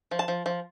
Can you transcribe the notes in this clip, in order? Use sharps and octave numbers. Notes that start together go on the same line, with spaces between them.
F3
A5
F3
F3